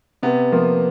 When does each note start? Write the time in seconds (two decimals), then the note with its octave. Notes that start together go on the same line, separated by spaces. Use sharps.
0.23 C3 B3
0.52 F3 A#3